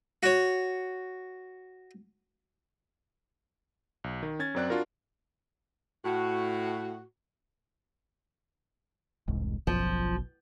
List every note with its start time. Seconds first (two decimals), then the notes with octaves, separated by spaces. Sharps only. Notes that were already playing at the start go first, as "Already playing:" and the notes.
0.23 F#4 C#5
4.04 B1
4.23 D#3
4.39 C#4 G#6 A6
4.54 F#2 F#3 C4 D5 F#6
4.70 D4 F4 F#4 A#4
6.05 A2 F#4
9.28 E1 C2 G#2
9.67 F#1 B1 F#2 F3